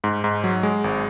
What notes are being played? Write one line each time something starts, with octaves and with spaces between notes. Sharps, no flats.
G#2
G#2
F#3
G#3
G#1